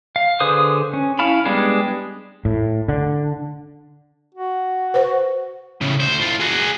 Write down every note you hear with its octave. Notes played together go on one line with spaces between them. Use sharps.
F5
D3 G#4 B4 C5 D#6
C#4
C#4 E4 F5 A5 B5
G3 G#3 B3 D4 G#4
A2
D3
F#4
B4 C5
A2 C#3
D2 C5
A2 F4
F#4 G#4